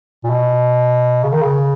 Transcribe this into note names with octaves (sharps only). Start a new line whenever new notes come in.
A#2
B2
C#3
D#3
C#3